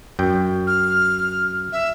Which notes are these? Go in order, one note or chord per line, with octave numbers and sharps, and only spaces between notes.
F#2 G5
F6
E5